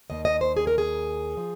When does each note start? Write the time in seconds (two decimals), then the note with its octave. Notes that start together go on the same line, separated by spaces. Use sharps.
0.10 D#2 D#3 D#5
0.25 D#5
0.41 C5
0.57 G#4
0.67 A#4
0.78 G#4
1.37 F3